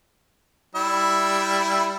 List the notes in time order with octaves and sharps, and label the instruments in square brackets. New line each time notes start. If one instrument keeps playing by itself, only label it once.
[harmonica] G3 E4 E5